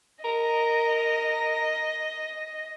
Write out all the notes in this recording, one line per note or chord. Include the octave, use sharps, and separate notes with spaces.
A#4 D#5